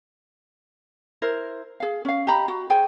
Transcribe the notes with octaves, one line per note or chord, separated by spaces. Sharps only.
E4 A#4 C5
G#4 F5
C#4 F5
G4 D#5 A#5 B5
F#4
G#4 C5 G5 G#5